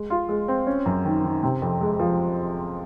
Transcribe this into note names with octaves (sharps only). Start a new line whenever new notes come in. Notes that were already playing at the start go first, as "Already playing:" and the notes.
Already playing: G#3
F4
G#3
C4
C#4
F#2
D#3
D#3
C3
F2
G#3
F3